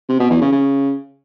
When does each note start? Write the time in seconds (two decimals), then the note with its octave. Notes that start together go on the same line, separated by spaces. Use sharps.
0.09 C3
0.20 B2
0.30 E2
0.41 C#3
0.52 C#3